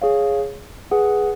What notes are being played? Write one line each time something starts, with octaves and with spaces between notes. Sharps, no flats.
G#4 C#5 F5
G#4 B4 F#5